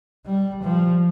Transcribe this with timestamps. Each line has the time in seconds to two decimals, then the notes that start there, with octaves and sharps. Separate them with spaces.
0.26 G3
0.64 F3